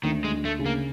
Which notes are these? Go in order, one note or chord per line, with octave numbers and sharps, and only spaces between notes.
D2 D#3
G#3
D2
A3
C#3
A#3